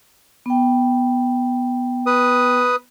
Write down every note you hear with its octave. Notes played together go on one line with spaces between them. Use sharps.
B3 G5
B4 D#6